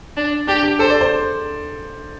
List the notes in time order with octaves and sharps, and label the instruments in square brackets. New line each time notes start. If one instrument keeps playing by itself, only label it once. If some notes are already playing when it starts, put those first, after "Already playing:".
[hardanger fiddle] D4
[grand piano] D4 [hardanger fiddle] G4
[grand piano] G4
[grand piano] A4 [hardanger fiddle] C5
[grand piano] D5
C5